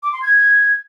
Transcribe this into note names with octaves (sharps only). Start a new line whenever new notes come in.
D6
C6
G#6